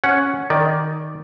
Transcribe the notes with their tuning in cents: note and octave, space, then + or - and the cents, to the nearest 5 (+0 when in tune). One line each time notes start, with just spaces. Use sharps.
C#4 +0 F#5 +0
D#3 +0 D5 +0